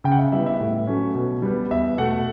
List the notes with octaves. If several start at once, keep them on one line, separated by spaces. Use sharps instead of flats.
C#3 G5
F#5
E5
G3 B3 E4 E5
E5
A2
F#3 A3 C#4
B2
G3 B3
E2 E5
B2 A3 F#5